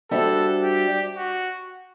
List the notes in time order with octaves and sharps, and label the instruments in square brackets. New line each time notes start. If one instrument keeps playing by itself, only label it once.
[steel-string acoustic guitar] G3 D4 F#4 C5 E5 [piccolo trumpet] A4
[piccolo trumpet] G4
F#4